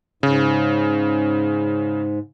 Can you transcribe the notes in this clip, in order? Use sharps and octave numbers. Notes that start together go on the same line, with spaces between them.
G#2 C#3